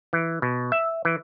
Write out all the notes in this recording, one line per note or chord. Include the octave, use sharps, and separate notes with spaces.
E3
B2
E5
E3